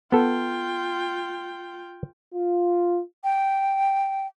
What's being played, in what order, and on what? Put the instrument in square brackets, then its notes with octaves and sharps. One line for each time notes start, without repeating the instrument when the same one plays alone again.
[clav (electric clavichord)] B3 A4 [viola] F4 G5
[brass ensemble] F4
[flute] G5